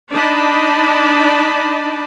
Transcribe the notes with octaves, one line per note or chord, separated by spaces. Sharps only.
D4 D#4 D5 D#5 A5 B5